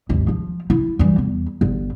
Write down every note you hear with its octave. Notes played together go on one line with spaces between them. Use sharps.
G#1 D#2
F3
E4
E3 G3
E2
G1